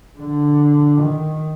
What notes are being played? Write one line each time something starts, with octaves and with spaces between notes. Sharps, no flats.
D3
D#3